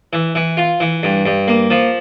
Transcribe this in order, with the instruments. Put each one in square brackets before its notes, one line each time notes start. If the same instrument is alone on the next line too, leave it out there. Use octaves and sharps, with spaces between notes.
[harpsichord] E3
E3
F4
E3
G2
G2
A#3
F3